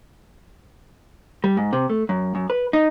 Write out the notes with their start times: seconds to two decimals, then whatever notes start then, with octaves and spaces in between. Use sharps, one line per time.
1.44 G3
1.57 G#2
1.73 C3
1.90 A3
2.09 F#2
2.35 F#2
2.50 B4
2.73 D#4